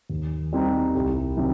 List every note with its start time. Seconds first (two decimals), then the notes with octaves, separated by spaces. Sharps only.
0.10 D#2
0.52 D#3 G3 C4 D#4
0.95 C2
1.37 C3 D#3 F#3